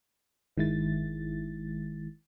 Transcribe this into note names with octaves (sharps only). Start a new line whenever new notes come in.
G1 D#3 G#3 E4 A6